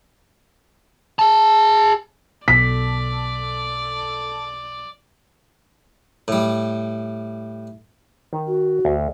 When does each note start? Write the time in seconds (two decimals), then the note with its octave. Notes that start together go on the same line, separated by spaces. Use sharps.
1.19 G#4 A5
2.48 B1 A4 D5 B6
6.28 A2 G3
8.33 D#3
8.47 F#4
8.85 D2